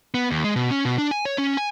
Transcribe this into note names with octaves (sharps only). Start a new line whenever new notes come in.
B3
D#2
G#3
B2
C#4
B2
D4
G#5
C#5
C#4
G#5